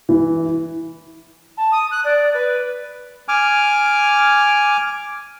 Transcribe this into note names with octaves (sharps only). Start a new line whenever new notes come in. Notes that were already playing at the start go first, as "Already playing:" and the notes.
E3
A5
D#6
F#6
D5
B4
G#5 D6 F6